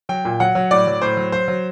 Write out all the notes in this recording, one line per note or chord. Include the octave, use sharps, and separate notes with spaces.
F#3 G5
A#2
F#3 F#5
F#3
A2 D5
F#3
A2 C5
F#3
F#3 C5
F#3